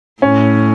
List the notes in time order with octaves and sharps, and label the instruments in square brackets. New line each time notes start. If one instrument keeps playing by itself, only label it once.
[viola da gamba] A2 [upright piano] C#4